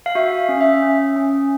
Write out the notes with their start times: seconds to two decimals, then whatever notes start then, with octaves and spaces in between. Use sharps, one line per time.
0.06 F5
0.15 F#4 E5
0.49 C#4
0.61 E5
0.82 C#4
1.16 C#4